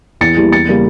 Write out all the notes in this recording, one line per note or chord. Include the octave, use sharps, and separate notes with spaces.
E2 A6 C#7
E3 G3 A#3
E2 A6 C#7
C#3 G3 A#3